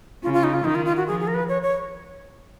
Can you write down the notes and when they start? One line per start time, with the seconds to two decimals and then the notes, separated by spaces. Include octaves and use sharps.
0.23 C#3 F4
0.33 F4
0.44 D#4
0.54 F4
0.64 D#3 D#4
0.75 F4
0.85 F4
0.97 F#4
1.06 F3 G#4
1.20 G#4
1.27 A#4
1.34 B4
1.49 C#5
1.62 C#5